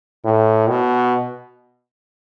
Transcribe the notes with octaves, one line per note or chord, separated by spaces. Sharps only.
A2
B2